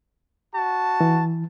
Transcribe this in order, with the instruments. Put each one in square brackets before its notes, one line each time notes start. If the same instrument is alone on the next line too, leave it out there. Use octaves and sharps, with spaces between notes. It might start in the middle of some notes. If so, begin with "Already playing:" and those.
[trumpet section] F#4 A5
[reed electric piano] E3